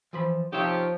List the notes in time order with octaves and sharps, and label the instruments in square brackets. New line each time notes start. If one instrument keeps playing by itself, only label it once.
[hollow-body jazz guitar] E3 F3 B5
[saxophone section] C3 C#4 G4 [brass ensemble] F3 [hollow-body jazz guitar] D#4 E5